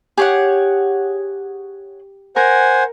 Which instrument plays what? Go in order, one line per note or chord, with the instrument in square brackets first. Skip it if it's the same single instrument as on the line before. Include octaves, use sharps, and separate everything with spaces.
[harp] G4 [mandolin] G#4 C#5 F#5
[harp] A#4 [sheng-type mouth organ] C5 F#5 G#5